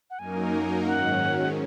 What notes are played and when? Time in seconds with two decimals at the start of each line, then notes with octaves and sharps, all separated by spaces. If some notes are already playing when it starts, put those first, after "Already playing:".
0.10 F#5
0.18 F#2 F#3 A#3 D#4 A#4 G#5
0.87 G#2 D#3 F#3 C#4 F#5